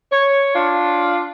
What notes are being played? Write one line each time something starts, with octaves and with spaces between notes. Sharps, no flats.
C#5
D4 F4